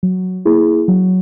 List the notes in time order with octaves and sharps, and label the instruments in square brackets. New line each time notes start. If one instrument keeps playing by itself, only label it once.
[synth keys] F#3
A#3 E4 G#4
F#3